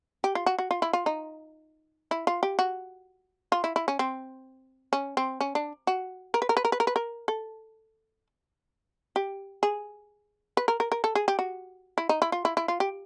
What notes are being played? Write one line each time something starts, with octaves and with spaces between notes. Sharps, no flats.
G4
F4
F#4
F#4
F4
E4
F4
D#4
E4
F4
G4
F#4
F4
E4
E4
C#4
C4
C#4
C4
C#4
D4
F#4
A#4
B4
A#4
B4
A#4
B4
A#4
B4
A#4
A4
G4
G#4
B4
A#4
A#4
A#4
A4
G#4
G4
F#4
E4
D#4
E4
F4
E4
E4
F4
G4